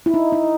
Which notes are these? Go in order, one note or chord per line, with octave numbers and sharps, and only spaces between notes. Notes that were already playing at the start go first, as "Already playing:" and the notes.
E4
D#4
D#4